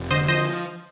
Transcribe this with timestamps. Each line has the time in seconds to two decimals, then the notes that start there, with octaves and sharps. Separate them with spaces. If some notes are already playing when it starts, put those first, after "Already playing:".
Already playing: F1
0.11 D3 C5 D#5
0.28 F3 C5 D#5